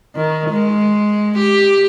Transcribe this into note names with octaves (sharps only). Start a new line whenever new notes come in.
D#3
G#3
G4